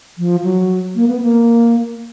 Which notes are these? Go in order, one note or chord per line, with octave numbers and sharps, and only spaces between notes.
F3
F#3
A#3
B3
A#3